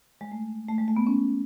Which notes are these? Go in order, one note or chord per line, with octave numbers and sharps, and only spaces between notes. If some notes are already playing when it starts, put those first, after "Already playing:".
G#3
A3
A3
G#3
A3
B3
C#4